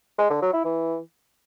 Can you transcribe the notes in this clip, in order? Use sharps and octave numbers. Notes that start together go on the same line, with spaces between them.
G#3
D3
F#3
E4
E3